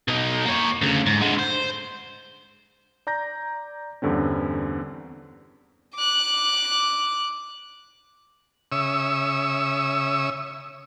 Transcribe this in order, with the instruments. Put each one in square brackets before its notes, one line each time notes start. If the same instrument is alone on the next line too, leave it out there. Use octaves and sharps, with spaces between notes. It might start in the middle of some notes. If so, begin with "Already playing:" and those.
[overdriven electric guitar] B2 D#4
A#3 C#5
D2 C#3
G#2
D3 G#3
C5
[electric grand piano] D5 A#5 G6 A#6
E2 G2 D3 C4 C#4
[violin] D6 F#6
[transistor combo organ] C#3 E5 C#6 D#6 E6